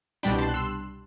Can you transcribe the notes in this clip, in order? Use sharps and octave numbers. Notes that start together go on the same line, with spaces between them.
C2 B2 G3 D4 G5 B5
A5 C6
F#6
C6 E6